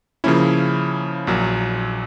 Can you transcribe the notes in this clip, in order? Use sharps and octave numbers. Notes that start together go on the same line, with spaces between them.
C#3 F3 A#3 C#4 E4
A#1 A#2 F#3